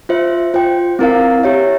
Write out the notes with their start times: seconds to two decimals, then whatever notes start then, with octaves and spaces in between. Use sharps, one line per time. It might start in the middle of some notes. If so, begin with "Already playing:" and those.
0.09 F4 C5 E5
0.54 F4 C5 G5
0.99 C4 E4 A#4 F5
1.43 E4 G4 C#5 E5